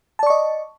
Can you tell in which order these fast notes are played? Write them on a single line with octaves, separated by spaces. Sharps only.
A5 D5 C#6 D#5